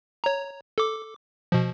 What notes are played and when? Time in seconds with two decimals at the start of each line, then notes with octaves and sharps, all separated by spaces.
0.24 C#5 A#5
0.78 A4 D6
1.52 B2 F3